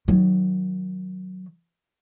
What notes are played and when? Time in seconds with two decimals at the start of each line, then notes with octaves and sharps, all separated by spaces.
0.08 D#3 F#3